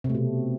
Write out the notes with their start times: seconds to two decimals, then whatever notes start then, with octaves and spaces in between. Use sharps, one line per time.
0.04 C3
0.09 A3
0.14 B2